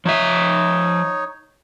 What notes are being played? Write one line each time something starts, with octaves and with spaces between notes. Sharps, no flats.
F3 D#4 C#5 E5